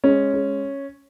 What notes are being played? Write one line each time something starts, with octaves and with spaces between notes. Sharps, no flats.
G#3 C#4
G#3